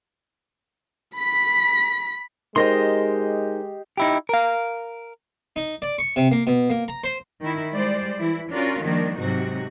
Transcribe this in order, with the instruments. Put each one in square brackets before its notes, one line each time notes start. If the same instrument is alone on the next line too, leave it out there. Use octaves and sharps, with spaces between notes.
[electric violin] B5 B6
[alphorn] G#3 [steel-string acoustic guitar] D#4 A#4 C5 [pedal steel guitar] G4 D#5 C6
[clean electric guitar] D#4 E4 G4
A#4 F5
[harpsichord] D#4
D5
C#6
C3
A#3
B2
A#3
A#5
C5
[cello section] D#3 E4
G3 G#3 C5 D5
E3 E4
C#4 D4 F4 F#4 A#4
D#3 F3 G3 A#3 D4
G#2 C3 F#3 D#4 F#4